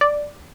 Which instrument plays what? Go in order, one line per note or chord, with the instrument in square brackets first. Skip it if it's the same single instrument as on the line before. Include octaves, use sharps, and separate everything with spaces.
[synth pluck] D5